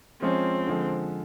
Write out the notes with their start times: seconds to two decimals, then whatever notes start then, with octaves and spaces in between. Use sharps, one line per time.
0.22 F3 G#3 C4 C#4 F4
0.67 D3 F3 G#3